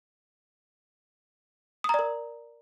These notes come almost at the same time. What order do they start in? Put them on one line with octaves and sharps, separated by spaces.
D#6 A#5 D5 A#4